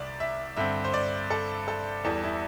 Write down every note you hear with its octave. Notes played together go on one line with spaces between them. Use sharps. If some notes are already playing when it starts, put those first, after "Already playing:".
Already playing: C2 C3 D5
E5
G2 D3 C4 E5
C5
D5
A4
A4
E2 E3 G3 A4
E4